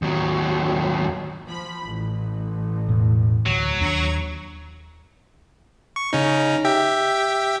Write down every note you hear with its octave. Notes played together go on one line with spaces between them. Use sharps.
D#2 F#3
F3 B5
A1
E1 A2
D2 F#3
D#2 D4 A#5 C#6 G#6
C#6
C#3 C#4 D#4
G4 E5 G5